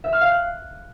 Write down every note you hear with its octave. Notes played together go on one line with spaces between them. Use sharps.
E5
F6
F5
F#6